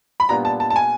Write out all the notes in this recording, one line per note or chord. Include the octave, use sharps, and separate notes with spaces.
B5
A#2 G3 B3 D4 A#5
A5
A5
A5
G#5